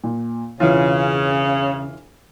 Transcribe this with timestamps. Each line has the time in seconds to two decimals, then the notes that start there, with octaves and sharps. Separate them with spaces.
0.04 A#2
0.60 E1 C#3 E3 F4